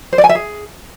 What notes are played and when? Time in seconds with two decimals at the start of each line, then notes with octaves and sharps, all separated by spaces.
0.13 C5
0.18 D5
0.24 G#5
0.29 E5
0.35 G#4